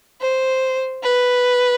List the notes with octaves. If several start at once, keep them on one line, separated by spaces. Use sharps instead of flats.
C5
B4